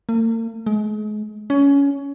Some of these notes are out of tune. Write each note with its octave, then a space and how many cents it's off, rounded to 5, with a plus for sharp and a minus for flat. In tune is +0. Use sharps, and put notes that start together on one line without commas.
A#3 -45
G#3 +35
C#4 +20